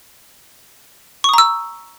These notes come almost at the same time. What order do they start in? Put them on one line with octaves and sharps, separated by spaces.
C#6 D#6 A#5 E6